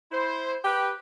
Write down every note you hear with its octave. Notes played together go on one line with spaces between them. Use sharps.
E4 C5
G4 B4